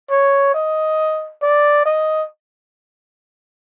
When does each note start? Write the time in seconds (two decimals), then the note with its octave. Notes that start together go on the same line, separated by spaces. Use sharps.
0.10 C#5
0.54 D#5
1.42 D5
1.86 D#5